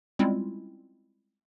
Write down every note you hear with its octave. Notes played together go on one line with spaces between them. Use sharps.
G3 G#3 C4 C#4 E4 F4